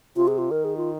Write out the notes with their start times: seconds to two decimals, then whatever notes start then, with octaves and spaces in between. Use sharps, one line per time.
0.16 C3 F4
0.27 G#4
0.38 F4
0.51 D#3 A#4
0.64 G#4
0.77 F4